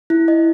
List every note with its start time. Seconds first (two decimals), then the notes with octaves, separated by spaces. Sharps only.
0.10 E4
0.28 D#5